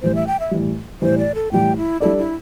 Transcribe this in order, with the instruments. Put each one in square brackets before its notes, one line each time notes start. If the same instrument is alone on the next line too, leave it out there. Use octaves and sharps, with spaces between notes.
[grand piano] A2 E3 G3 [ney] C5
[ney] E5
G5
E5
[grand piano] A2 E3 G3
[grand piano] A2 E3 G3 [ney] C5
[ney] D5
A4
[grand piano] A2 E3 G3 [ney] G5
[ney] E4
[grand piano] G3 D4 A4 D5 [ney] E4
[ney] E4